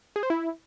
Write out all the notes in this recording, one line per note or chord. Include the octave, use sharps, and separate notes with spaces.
G#4
C5
E4